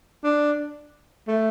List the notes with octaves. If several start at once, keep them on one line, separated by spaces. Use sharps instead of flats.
D4
A3